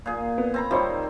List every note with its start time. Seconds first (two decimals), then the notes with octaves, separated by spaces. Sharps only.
0.06 A#2 G#4
0.38 B3
0.54 C4 A#5 B5
0.71 D#3 G3 C4 F4 C5 C#5